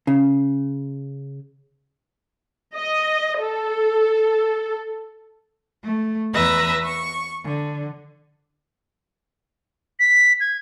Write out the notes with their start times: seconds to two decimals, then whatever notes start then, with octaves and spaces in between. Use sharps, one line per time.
0.07 C#3
2.75 D#5
3.41 A4
5.84 A3
6.34 E2 B4 E5 A#5 A#6
6.82 C#6
7.43 D3
10.00 B6
10.40 G#6